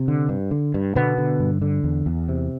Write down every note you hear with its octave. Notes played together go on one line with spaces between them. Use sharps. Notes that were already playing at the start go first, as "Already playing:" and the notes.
Already playing: C3
D3
G2
D3
G2
B2 D3 B3
D3
G2
D3
E2
E2
C3